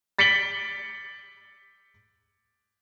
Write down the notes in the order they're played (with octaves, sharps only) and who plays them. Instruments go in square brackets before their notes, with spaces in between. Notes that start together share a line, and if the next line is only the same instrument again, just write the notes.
[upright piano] A6 B6 C#7 D7 F#7 G7